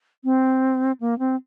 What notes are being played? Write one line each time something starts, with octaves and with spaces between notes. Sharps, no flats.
C4
A#3
C4